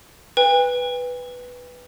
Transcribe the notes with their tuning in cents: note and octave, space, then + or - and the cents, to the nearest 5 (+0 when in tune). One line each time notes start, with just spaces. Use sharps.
B4 +0 G5 +45